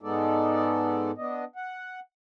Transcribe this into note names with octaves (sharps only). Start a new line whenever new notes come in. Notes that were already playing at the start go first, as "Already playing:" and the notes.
G#2 G#3 B3 D#4 A4 D5
B3 D4 D#5
F#5